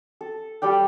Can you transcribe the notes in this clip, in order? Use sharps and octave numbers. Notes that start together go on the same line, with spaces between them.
A4
G3 A4 D5 G5